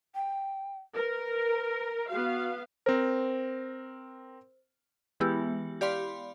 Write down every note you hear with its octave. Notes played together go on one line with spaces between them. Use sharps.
G5
A#4 B4
B3 F#4 F5
C4 A#4 C5
E3 G#3 B3 E4 G4
G4 D5 F5 B5 C6